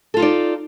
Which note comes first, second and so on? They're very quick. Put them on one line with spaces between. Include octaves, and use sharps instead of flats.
A4 F4 D#4 D5